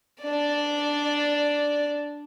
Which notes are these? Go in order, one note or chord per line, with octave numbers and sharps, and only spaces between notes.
D4 D5